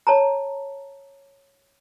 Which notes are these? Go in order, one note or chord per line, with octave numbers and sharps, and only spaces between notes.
C#5 A5 A#5